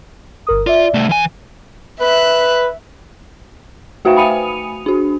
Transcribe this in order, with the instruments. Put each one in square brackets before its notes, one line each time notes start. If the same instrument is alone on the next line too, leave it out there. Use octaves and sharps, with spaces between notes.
[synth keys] G1 A#4 D#6
[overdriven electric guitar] F4 [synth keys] D5 E5
[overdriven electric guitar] C2 A3
E3 G#5
[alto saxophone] B4 [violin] E5 F#6
[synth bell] A3 F#4 B4 E5 F5 G5
G#5 B5 D#6 C#7 D#7 F7
D4 F#4